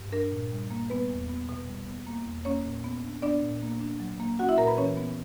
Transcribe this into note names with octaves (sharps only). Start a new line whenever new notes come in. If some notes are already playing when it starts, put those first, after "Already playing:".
Already playing: G2
D4 A#4
A#2
G3
A#3
G3 B3 B4
E2
B3
B2
G3
B3
A#3
E2
A#3 C#4 C#5
A#2
B3
D4
B3 D4 D5
A#2
A#3
D4
F#3
A#3
C#4 F#4 F#5
E4 E5
A#2 A#4 A#5
B4 B5
E3 C#4 C#5
B3